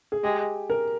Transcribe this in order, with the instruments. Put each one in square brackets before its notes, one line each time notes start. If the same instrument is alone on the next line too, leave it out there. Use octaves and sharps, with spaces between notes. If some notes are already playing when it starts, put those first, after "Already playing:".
[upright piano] G#4
[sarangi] G#3 [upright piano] G4
[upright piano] A#4